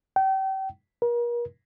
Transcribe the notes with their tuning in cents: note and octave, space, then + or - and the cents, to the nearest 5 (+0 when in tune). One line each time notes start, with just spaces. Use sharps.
G5 -35
A#4 +40